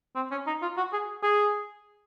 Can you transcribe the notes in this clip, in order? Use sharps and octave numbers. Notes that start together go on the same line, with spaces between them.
C4
C#4
D#4
F4
F#4
G#4
G#4